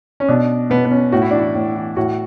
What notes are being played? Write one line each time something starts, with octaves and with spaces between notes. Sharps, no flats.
C#4
B2 D4
B2 B3
B3
C#4
A2 F#4
E4
E3 D4
E4
A2
E3
A2 F#4